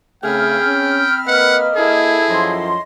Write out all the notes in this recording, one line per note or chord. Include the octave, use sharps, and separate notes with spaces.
C#3 A3 C4 G#4 G5 B5 F6
C#4
A#3 B4 D#5 F#5
E4 G#4 A4
F#2 F3 C#5 D#5 C6